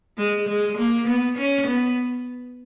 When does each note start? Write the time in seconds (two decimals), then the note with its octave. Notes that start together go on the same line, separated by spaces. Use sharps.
0.18 G#3
0.48 G#3
0.78 A#3
1.07 B3
1.38 C#4
1.67 B3